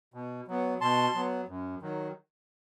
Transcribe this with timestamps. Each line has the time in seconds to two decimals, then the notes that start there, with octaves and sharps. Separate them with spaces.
0.14 B2
0.48 F#3 B3
0.81 B2 A5 C6
1.15 F#3 B3
1.48 F#2
1.82 D#3 F#3